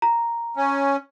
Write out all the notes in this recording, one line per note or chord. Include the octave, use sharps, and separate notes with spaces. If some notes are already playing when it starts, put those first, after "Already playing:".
A#5
C#4